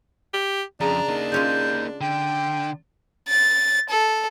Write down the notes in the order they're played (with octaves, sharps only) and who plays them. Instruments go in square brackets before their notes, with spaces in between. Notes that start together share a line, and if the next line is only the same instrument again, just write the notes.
[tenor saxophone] G4
[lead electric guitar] F2 [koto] C#3 [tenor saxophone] D4 [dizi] A#5
[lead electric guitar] A#3 D#4
[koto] G#3 C#4 F4 [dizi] G6
[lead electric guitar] D3 [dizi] G5
[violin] A6
A4